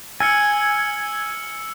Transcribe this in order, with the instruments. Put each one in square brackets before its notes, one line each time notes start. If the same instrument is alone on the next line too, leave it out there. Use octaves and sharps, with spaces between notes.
[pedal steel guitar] G#5 [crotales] E6 F6 C#7